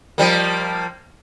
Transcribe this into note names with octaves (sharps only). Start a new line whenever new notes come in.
F3 G3 A#3